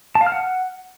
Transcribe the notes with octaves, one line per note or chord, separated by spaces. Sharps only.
A5
F5
F6
F#5